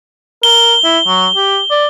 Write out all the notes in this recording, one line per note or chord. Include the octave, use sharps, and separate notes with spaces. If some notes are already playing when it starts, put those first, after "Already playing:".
A#4 G7
E4
F#3
G4
D5